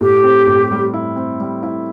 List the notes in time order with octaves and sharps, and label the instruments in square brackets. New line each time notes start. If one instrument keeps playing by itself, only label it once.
[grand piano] A2 [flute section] G4
[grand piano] C4
A2
G3
E4
C4
G3
E4